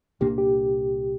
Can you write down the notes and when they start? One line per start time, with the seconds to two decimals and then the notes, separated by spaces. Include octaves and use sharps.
0.21 C2 A#2 A#3 D4 G4
0.38 G4